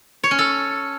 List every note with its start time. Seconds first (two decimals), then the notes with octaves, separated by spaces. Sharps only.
0.24 C#5
0.31 C#4
0.39 A4